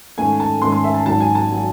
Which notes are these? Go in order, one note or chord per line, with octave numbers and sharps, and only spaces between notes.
G#2 D#3 A3 C#4 G#5
A5
G#2 D#3 A3 C#4 C6
C6
E5
A5
G#1 G#2 F#3 A5
G#5
A5
F#3